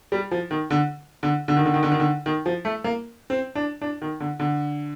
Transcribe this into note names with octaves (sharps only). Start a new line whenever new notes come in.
G3
F3
D#3
D3
D3
D3
D#3
D3
D#3
D3
D#3
D3
D#3
F3
A3
A#3
C4
D4
D4
D#3
D3
D3